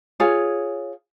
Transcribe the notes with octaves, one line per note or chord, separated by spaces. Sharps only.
F4 G#4 C#5 G#5